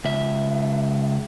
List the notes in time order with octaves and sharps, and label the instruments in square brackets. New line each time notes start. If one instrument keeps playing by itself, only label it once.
[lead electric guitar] C#2 E5